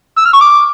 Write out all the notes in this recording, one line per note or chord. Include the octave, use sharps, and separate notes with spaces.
E6
F6
C#6
D6